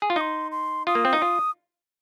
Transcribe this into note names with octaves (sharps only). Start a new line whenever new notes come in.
G#4
F4
D#4 C6 D#6
C6
F4 D#6
A#3
C4
D#4
F4